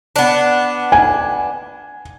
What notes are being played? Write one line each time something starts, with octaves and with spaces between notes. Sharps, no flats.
B3 D4
G#5